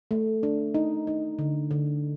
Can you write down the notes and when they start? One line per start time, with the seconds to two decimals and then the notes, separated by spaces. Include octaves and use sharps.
0.11 A3
0.43 D4
0.74 D#4
1.07 D#4
1.39 D3
1.71 D3